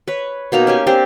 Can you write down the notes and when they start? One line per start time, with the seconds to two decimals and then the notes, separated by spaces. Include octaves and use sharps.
0.08 B4 C#5
0.52 B2 A#3 D#4 A#5
0.67 C#4 G4 G#5
0.87 C4 D4 G4 C5